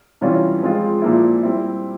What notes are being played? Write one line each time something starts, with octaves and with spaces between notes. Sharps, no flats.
C3 E3 G3 C#4 F4
F3 G#3 C4 F4
A#2 F3 A#3 E4
G3 C4 E4